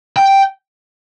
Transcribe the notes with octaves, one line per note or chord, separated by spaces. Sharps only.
G5